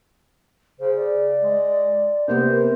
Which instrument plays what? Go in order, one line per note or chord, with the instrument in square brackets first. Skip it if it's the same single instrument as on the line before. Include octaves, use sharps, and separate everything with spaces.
[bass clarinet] C#3 [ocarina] C5
[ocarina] D5
[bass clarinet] G#3
[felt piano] C3 A#3 B3 [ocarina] A#4 [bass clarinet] C5